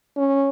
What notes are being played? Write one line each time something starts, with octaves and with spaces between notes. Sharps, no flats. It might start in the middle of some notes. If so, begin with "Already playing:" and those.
C#4